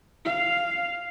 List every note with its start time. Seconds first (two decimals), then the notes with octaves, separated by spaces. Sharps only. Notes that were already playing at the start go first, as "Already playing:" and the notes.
0.25 F5